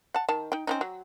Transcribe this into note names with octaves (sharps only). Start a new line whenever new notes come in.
F#5 A5
D#3 A5
D#4 G5
C4 C#4 D#4
F#3